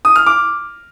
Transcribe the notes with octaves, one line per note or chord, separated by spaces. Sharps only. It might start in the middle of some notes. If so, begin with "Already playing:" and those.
D#6
F6
D6